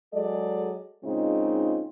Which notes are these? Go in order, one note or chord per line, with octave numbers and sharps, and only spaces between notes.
F#3 G#3 G#4 A4 D5 D#5
A#2 C#3 G#3 C4 D#4 F4